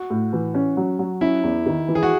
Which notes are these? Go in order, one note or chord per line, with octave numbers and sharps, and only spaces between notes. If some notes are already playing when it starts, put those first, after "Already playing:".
Already playing: F#4
A2
E3
C#4
F#3
F#3
C#4 E4
E2
D#3
E3
G#4
F#4